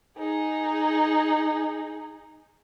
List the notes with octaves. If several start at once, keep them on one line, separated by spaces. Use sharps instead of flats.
D#4 G#4